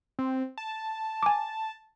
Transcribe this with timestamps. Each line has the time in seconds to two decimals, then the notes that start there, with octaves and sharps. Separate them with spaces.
0.19 C4
0.58 A5
1.23 G#5 D6